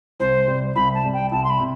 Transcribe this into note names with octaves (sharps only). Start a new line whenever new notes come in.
C2 C5
C3 G3
C2 B5
A5
C3 G3
G5
C2 A5
C6
B5
C3